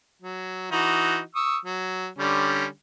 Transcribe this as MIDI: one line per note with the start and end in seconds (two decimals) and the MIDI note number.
0.22 0.71 54
0.72 1.20 52
0.72 1.20 63
0.72 1.20 66
1.35 1.57 85
1.35 1.57 87
1.35 1.57 88
1.66 2.08 54
2.19 2.65 50
2.19 2.65 55
2.19 2.65 61